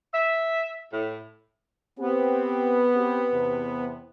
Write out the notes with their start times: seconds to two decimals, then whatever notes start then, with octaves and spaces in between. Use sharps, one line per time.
0.14 E5
0.93 A2
1.99 B3 C4 G4
2.95 C4 G4
3.32 E2 C3